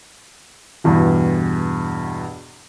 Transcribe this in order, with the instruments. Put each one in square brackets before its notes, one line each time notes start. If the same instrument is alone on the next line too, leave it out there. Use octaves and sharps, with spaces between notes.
[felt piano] E2 G2 B2 E3